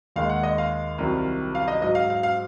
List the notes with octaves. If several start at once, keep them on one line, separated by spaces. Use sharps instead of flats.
D#2 D#3 G#3 F5
F#5
D#5
F5
C2 C3 D#3 F#3
F5
D#5
G#2 F#3 D#5
F5
F5
F5